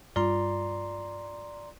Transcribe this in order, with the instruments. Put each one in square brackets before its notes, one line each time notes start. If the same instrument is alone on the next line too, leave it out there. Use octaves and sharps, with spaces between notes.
[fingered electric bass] G2 G3 [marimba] F4 [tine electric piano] D5 A#5 C6